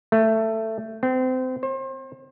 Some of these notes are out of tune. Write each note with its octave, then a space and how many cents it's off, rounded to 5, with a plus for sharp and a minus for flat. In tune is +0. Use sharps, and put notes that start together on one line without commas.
A3 +10
C4 -30
C5 +35